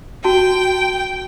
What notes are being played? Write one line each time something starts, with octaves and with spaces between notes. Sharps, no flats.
F#4 G5 A5